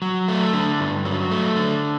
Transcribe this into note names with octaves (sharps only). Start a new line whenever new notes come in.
F#3
A3
D3
G2
F#3
A3
D3